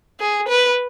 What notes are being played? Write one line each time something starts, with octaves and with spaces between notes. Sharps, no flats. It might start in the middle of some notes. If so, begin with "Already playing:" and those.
G#4
B4